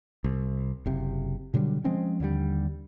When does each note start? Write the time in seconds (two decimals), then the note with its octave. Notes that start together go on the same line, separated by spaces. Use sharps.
0.24 C2
0.86 F#1 C3
1.54 B2 D3 F#3 G3
1.84 F3 G#3 C4 C#4
2.20 D#2 D3 D#3 G3